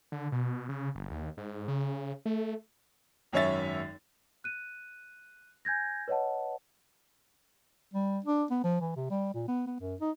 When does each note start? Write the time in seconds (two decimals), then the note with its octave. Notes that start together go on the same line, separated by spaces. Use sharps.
0.12 D3
0.32 B2
0.69 C#3
0.95 G1
1.11 D#2
1.37 G#2
1.68 C#3
2.26 A3
3.33 G#1 F#2 C#4 C#5 E5 A6
4.44 F#6 D#7
5.65 G#5 G6 G#6 A#6
6.08 B4 C#5 D#5 F#5 A5
7.94 G3
8.25 D4
8.51 B3
8.64 F3
8.81 E3
8.96 C3
9.10 G3
9.34 A#2
9.48 B3
9.67 B3
9.80 F#2
10.01 D#4